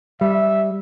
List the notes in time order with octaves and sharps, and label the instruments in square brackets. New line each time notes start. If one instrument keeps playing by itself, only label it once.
[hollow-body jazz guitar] G3 [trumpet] E5